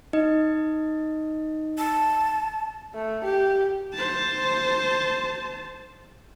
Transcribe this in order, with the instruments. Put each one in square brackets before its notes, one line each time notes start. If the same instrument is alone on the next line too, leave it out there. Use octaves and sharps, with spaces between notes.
[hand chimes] D#4 D#5
[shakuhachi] A5
[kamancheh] A3
G4
[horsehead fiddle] C5 A5